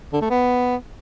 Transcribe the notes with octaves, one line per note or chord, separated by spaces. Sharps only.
D3
A3
B3